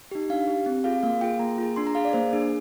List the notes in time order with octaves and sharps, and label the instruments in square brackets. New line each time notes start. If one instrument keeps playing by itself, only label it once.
[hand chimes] D#4 G4
D4 F5
G4
C4
F4 G#4 F5
A#3 F5
F4 G#4 G5
A#3 A#5
F4 G#4
D4 C6
A#5
G#4 F5
D5
A#3 C5
D4 G#4